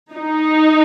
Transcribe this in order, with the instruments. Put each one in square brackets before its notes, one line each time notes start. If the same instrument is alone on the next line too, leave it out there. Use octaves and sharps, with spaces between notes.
[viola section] D#4